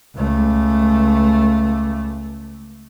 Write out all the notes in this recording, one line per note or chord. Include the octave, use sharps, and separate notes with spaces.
C#2 A3